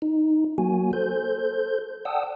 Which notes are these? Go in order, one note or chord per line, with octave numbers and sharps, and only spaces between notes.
D#4
F#3 A#3 F#4 G#5
A4 C5 G6
D5 F#5 G5 A5 D#6 E6